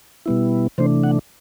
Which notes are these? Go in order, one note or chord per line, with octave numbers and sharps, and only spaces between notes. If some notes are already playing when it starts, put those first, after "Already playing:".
B2 G3 B3 E4
C3 E3 A3 D4 C5
F#5